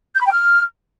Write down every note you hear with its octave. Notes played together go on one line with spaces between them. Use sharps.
G6
B5
G5
F6